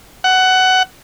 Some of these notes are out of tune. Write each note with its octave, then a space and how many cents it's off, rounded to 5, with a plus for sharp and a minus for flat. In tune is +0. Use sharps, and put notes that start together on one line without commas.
F#5 +15